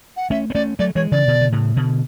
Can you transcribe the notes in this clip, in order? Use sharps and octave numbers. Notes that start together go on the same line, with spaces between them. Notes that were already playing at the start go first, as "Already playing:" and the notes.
F#5
A3 C#4 E5
B3
A3 C#4 D5
F#3 A3 D5
E3 G#3 C#5
C#3 E3 D5
B2 D3
D3
A2 C#3
B2 D3